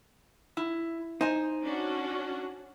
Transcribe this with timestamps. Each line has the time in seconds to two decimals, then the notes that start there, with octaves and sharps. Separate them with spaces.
0.57 E4
1.21 D#4 C5 G#5
1.63 C#4 D4 F#4